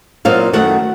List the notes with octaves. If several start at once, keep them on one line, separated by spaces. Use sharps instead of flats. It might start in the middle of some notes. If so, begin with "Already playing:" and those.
A#2 F#3 C4 D#4 F4 F5
F#2 D#3 A3 F#4 F#5